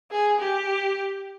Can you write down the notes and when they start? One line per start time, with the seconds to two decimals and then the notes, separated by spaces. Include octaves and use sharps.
0.11 G#4
0.39 G4